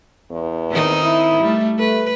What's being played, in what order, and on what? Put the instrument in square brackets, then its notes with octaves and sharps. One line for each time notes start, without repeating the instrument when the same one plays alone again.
[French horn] E2
[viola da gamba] D#3 C4 D#4
[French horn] E4
[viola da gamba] G3 A3
[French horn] A3 [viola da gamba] B4